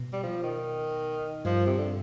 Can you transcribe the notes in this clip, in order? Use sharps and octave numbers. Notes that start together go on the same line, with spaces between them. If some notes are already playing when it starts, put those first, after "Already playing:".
Already playing: B2
G3
F3
D#3
G2 F3
C3
D3